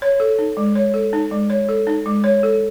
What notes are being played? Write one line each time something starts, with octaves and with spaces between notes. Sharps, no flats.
C#5
A4
D#4
G#3
C#5
A4
D#4
G#3
C#5
A4
D#4
G#3
C#5
A4